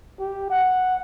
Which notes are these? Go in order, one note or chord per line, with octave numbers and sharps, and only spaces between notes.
G4
F#5